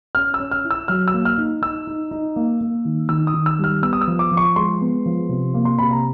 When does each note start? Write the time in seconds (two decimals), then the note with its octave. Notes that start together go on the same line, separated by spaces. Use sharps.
0.15 C#4 F6
0.34 E6
0.40 C#4
0.51 F6
0.64 E4
0.71 E6
0.88 F#3 F6
1.08 E6
1.14 A#3
1.25 F6
1.38 D#4
1.62 D#4 E6
1.87 D#4
2.11 D#4
2.36 A#3
2.61 A#3
2.85 D#3
3.09 D#3 E6
3.27 D#6
3.34 D#3
3.46 E6
3.59 G3
3.64 F6
3.82 B3 E6
3.93 D#6
4.01 E6
4.07 F3
4.19 D6
4.31 F3
4.37 C#6
4.56 G#3 C6
4.81 B3
5.06 F3
5.29 C3
5.54 A#3
5.65 C6
5.79 C3 B5
5.91 A#5